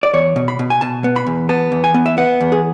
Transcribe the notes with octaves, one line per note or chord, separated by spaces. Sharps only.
D5
E2 C#5
B2
B5
B2
G#5
B2 A5
B3
B5
E2
B3 A5
E2
G#5
B3
E5
B3 F#5
E2
G#4